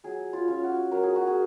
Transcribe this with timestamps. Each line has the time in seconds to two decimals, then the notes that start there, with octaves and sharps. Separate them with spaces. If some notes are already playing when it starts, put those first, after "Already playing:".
0.04 F#3 G#4
0.33 F4
0.48 C#4 F4
0.63 F#4
0.91 F#3 A#4
1.03 G#4
1.16 F#4
1.27 G#4